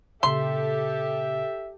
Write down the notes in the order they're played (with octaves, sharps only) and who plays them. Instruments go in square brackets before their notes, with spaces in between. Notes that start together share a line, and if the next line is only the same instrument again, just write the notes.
[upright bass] A#2 C#3 [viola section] G4 A4 [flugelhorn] E5 [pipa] C6